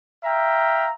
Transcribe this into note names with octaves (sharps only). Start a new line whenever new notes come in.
E5 F5 G5 A#5